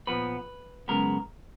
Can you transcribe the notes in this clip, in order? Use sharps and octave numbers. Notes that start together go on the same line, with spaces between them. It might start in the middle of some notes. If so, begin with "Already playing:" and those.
A#2 F3 B3 B4
F#2 C#3 G#3 B3 A#4